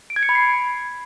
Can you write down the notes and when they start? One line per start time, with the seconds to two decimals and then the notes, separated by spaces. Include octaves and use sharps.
0.10 D7
0.16 G#6
0.23 C#7
0.29 B5
0.35 C7